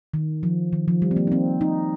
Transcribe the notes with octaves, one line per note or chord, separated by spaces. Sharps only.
D#3
F3
D#3
F3
G3
C4
A#3
D#4
C4
D#4